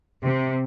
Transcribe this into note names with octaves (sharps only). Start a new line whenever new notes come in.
C3